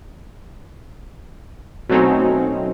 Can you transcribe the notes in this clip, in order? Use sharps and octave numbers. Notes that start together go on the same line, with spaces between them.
B2 F#3 A3 C4 C#4 D#4